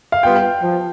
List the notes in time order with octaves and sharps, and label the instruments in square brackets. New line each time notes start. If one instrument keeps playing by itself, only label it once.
[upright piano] F5
[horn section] G3 B3 F4 [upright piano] G5
[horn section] F3